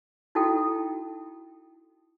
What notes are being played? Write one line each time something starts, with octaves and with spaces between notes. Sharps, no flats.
D#4 E4 F#4 A4 G5